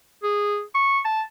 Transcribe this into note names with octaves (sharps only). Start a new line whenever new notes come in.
G#4
C#6
A5